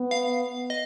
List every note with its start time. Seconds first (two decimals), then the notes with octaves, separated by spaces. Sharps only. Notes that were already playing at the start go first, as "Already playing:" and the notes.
Already playing: B3
0.11 F5
0.70 D#5